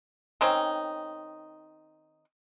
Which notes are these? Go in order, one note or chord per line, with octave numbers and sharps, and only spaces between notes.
D#3 C4 C#4 D#4